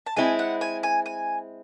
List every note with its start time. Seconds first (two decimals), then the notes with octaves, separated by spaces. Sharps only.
0.06 A5
0.16 G#3 C4 E4 G#5
0.39 F#5
0.61 G#5
0.83 G#5
1.06 G#5